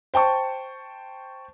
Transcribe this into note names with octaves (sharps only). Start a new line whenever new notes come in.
C5 G5 A5 C#6